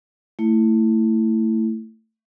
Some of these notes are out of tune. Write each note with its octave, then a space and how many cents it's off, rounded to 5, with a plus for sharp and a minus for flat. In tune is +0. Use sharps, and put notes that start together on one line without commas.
A3 +25 E4 +0